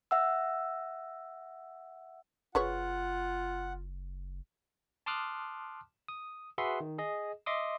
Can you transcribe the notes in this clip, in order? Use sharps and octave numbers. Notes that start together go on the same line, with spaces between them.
E5 F#5 E6
F#1 F4 G#4 B4 C#5 F#5
A5 C6 D6 D#6 F6 F#6
D#6
F#4 G#4 B4 E5 F#5 C6
D#3
G#4 D#5
D#5 E5 C6 D6 D#6